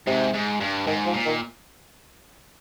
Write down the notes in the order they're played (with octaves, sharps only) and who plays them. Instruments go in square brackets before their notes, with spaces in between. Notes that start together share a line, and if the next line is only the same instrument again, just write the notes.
[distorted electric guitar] G#2 [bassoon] C3
[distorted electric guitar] G#2
G2
[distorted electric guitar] G#2 [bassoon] D#3
[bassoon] F3
[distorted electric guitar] A#2
[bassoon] D#3